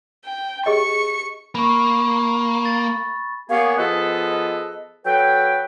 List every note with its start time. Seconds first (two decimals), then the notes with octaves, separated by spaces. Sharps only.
0.25 G5
0.66 G4 G#4 D#5 C#6 C#7
1.55 A#3 B5 C#6
2.65 A6
3.50 A#3 B3 G4 G#4 C#5 F5
3.78 F3 B3 G#4 A4 B4 D#5
5.05 F#3 A4 B4 G5